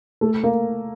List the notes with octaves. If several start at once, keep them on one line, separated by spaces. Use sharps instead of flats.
A3
A#3